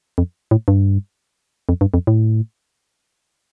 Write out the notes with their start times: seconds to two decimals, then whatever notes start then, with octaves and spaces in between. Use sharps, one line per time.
0.18 F2
0.51 A2
0.68 G2
1.69 F2
1.81 G2
1.94 F2
2.07 A2